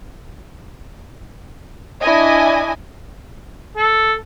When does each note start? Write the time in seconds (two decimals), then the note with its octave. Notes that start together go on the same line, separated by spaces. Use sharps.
2.02 D4 E4 D#5 G#5
3.77 A4